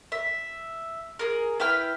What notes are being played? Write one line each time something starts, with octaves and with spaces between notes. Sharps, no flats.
E5
G#4 A#4
E4 B4 G5 F6